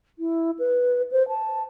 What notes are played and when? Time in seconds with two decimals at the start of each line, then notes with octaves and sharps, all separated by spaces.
0.19 E4
0.59 B4
1.12 C5
1.28 A5